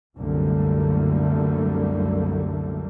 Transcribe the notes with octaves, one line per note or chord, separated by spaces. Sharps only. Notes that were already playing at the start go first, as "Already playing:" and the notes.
C2 F#2 D3 G3 A3 A#3